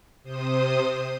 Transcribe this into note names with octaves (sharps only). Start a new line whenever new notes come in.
C3 C5 D#6